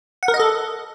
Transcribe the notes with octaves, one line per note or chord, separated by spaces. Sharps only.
F#5
A#4
D#5
A4